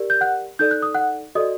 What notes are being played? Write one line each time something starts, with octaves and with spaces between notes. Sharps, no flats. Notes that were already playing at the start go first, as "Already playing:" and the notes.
Already playing: G4 A#4 D5
G6
F#5 F#6
D#4 A4 D5 G6
F#6
D#6
F#5 F#6
F#4 A4 D5 D#5 D#6